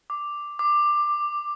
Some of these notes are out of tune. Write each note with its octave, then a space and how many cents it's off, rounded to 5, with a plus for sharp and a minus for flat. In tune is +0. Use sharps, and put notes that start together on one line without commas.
D6 +0
D6 +15